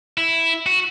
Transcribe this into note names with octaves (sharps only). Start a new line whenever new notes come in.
E4
F#4